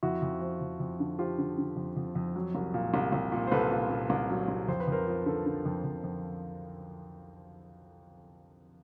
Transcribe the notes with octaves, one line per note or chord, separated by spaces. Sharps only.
F2 E4 F#4
F2
F3
F2
F2
D3
F3 F4 G4
D3
D3
F2
F2
F2
F#3
C2
A#2
C2
C2
A#2
C5
C2 A4 B4
A#2
A#2
C2
F#3
C2
F2 C5
B4
F2 A#4 C5
F3
D3 A4 B4
D3
F2
F2
F2